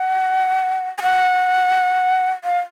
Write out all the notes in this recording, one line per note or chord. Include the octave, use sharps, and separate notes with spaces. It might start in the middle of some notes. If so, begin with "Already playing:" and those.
Already playing: F#5
G#5
F#5
F5